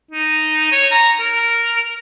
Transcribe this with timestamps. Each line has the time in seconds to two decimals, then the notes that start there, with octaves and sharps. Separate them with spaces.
0.11 D#4
0.72 C#5
0.91 A#5
1.20 A#4